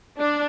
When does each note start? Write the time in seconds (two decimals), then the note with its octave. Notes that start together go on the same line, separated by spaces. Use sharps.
0.18 D4